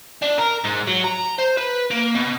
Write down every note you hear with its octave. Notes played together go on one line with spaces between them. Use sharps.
D4
A#4
G#2
F#3
A#5
C5
B4
A#3
B2